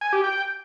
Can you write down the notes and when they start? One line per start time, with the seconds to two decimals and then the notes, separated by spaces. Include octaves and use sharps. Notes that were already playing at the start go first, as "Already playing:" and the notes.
0.01 G#5
0.13 G4
0.24 G5